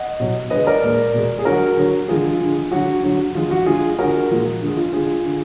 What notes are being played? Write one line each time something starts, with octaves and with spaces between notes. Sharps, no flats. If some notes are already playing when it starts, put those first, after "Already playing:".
Already playing: D#5 F#5
B2 F#3
D3 G#3 B4 D#5
A#4 D5
A#2 G#3
B2 G#3
G#4
D3 F#3 F#4 A#4
D3 F#3
D3 F3 G#3 F4 G#4
D3 G#3
D3 F#3 F#4
D3 F#3
D3 F3 G#3 F4
F#4
D3 G#3 F4 G#4
D3 G#3 F#4 A#4
A#2 F3 G#3
D3 G#3
F4
D3 G#3 F4 G#4
D3